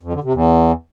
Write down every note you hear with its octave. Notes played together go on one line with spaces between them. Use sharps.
F2
D3
C3
E2